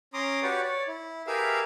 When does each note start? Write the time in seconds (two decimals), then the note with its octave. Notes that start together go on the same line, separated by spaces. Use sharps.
0.14 C#4 A#5 C6 D6 D#6
0.43 F#4 G4 B4 C#5 D5
0.63 C#5 D5
0.88 E4
1.27 G4 G#4 A#4 B4 E5 F5